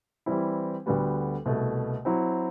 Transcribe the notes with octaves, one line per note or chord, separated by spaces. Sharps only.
E3 G3 C4 E4
D2 D3 G3 B3 F#4
C2 B2 A3
F#3 C4 E4